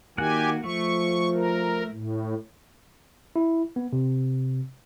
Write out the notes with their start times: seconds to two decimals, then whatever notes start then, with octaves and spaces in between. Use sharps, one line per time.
0.18 D#3 A#3 F#4 G4 F#5 G#5
0.64 F3 A3 C#6
1.34 A#4
1.91 A2
3.36 E4
3.76 B3
3.93 C3